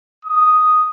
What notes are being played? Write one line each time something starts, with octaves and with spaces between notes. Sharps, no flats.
D#6